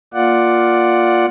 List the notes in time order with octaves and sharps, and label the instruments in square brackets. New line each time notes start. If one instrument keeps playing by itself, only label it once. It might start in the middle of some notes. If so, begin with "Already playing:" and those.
[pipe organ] A#3 F4 D5 F#5